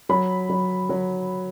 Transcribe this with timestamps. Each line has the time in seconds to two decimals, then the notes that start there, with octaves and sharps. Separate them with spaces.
0.09 F#3 B5
0.49 F#3
0.89 F#3